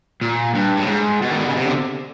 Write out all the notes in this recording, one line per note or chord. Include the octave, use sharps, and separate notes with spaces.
A#2
G2
A2
G#2
B2
D#3
D3
C#3
C3
D3